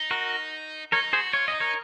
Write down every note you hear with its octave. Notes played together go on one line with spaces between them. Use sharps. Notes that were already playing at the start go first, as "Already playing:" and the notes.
Already playing: D#4
F#4 A#4
D#4 A#4 C#5
F#4 G#4 C5
F4 C#5
C#4 D#5
D#4
A#4 C#5